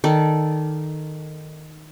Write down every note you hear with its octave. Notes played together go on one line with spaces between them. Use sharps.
D#3 A4 D5